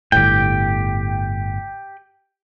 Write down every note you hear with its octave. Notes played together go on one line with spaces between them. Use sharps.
G1 A2 G4 G5